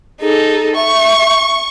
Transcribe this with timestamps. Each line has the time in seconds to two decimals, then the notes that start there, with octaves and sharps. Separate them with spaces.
0.21 D#4 G#4 A4
0.75 E5 C#6